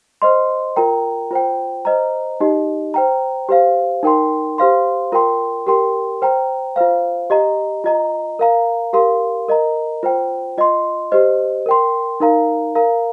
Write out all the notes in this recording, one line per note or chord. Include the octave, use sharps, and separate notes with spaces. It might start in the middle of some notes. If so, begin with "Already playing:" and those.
C5 D#5 C6
F4 A#4 G5 A#5
F4 C5 G5
C5 D#5 A#5
D#4 G4 D#5
C5 G5 A#5
G4 C5 F5
D#4 A#4 G5 C6
G4 C5 F5 C6
F4 A#4 G5 C6
G4 A#4 G5 C6
C5 G5 A#5
F4 C5 F5
G4 D#5 A#5
F4 D#5 A#5
A#4 F5 A#5
G4 A#4 F5 C6
A#4 D#5 A#5
F4 C5 G5
F4 D#5 C6
G4 C5 D#5
A#4 G5 C6
D#4 A#4 F5 A#5
A#4 F5 A#5